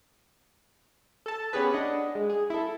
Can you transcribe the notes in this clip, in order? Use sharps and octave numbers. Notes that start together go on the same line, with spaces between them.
A4 A5
B3 C#4 G4 G#4 B4
D4 D#5 F#5
G#3
G#4
E4 A4